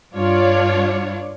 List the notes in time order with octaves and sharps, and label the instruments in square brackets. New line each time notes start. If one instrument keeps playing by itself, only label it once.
[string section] G2 D4 F4 C#5 D5